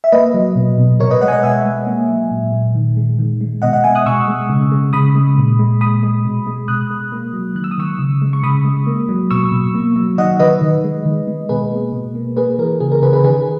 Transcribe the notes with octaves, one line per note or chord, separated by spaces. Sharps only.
E5
A#3 B4 D#5
F#3
B2
B2
B2 A#4 C#5
B4 D#5
G#3 D#5 F#5
G#5
D#5 F#5
B2 E5 G#5
G#3
A#3
F#3
A#2
A#2
D#3
G#3
D#3
G#3
B2 D#5 F#5
D#5 F#5
G#3 E5 G#5
D#6 F#6
B2 C#6 E6
G#3
C#3
G#3
C#3 B5 D#6
G#3
A#2
G#3
A#2 B5 D#6
G#3
B2
G#3
B2 D#6 F#6
G#3
A#3
F#3
D#3 F#6
E6
D#6
D#3 C#6 E6
C#3
G#3
C#6
C#3 B5 D#6
G#3
A#3
F#3
B2 C#6 E6
B2
A#3
F#3
D#3 D#5 F#5
D#3 B4 D#5
D#3
G#3
D#3
G#3
B2 G#4 B4
A#3
B2
A#3
A#3 G#4 B4
E3 A#4
C#3 G#4
A#4
C#3 G#4 B4
G#4 B4
D#3 G#4 B4